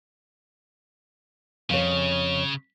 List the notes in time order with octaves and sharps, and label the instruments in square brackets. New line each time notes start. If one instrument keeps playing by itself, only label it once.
[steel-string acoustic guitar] F2 C#5 [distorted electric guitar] C#3